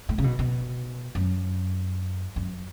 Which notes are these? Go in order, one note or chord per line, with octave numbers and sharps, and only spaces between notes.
A2
C#3
B2
B2
F#2
F#2